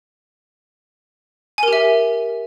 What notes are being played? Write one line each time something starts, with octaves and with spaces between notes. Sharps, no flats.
G4 A#4 E5 G#5